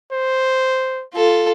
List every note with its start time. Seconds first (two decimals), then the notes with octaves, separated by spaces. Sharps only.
0.12 C5
1.15 F4 A4